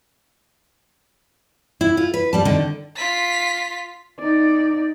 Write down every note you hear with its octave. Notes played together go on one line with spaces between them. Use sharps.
E4
F4
B4
F2 G3 A5
D3 D#3
F4 B6
D#4 D5